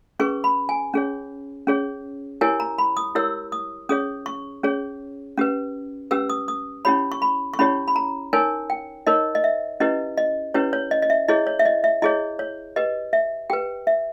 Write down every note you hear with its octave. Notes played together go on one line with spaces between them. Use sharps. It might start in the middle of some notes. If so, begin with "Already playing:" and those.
C#4 G#4 B4 C#6
B5
G#5
C#4 G#4 C#5
C#4 G#4 C#5
E4 G4 A#4 C#5 G#5
A#5
B5
D#6
E4 G4 A#4 C#5 E6
D#6
C#4 G#4 C#5 D#6
C#6
C#4 G#4 C#5
C#4 G4 B4
C#4 G4 B4 E6
D#6
D#6
C#4 E4 G4 C#5 B5
C#6
B5
C#6
C#4 E4 G4 C#5 B5
B5
A#5
D#4 A#4 C#5 G#5
G5
D#4 A#4 C#5 D#5
D#5
E5
C#4 E4 G4 B4 D#5
D#5
C#4 E4 G4 B4 C#5
C#5
D#5
D#5
E5
E4 G#4 C#5 D#5
C#5
E5
D#5
E5
E4 G#4 C#5 D#5
C#5
G4 B4 D#5
E5
G4 B4 G5
E5